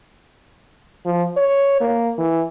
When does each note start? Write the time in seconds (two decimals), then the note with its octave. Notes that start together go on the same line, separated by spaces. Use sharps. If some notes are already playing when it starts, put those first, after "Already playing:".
1.06 F3
1.37 C#5
1.81 A#3
2.18 E3